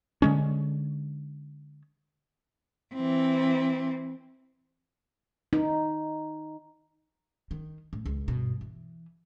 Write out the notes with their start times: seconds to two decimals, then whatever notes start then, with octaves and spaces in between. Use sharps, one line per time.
0.22 D3 G#3 C#4
2.94 E3 C4
5.53 D#4
7.51 D#3
7.93 A2
8.06 C#2
8.28 G2 B2
8.61 E3